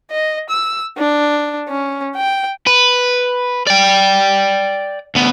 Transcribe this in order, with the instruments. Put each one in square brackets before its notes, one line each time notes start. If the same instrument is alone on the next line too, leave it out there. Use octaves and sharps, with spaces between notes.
[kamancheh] D#5
E6
D4
C#4
G5
[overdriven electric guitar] B4
D5 G5
D2 B3